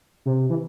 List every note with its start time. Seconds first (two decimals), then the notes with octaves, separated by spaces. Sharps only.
0.26 C3
0.50 E3